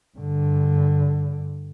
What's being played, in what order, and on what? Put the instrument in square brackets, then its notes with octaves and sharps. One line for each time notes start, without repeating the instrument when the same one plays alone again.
[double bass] G2 D3